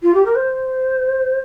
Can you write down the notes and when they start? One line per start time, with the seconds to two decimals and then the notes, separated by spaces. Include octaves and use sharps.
0.02 F4
0.14 G4
0.25 A#4
0.35 C5